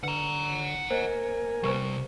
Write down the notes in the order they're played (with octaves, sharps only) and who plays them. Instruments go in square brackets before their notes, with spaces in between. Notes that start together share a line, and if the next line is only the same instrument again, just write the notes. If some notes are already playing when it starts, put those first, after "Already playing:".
[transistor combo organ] D3 [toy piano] B4 [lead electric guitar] F#5 A#5
[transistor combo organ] A#3 A#4 G#5 [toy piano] C5 D#5
[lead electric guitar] C3 G3 [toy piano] G4 B4 C5